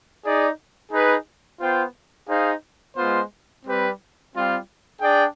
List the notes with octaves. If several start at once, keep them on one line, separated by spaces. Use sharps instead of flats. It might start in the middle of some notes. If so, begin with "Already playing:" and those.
D#4 G#4 D5
D#4 G#4 B4
B3 F4 C5 G5
D#4 G#4 C5 F5
G#3 B3 F4 C5
G3 C4 G4 B4
G3 C4 F4
D4 G#4 D5 G5